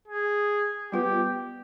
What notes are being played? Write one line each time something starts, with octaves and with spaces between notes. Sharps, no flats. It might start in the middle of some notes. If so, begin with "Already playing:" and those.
G#4
G3 B3 F4 G4 B4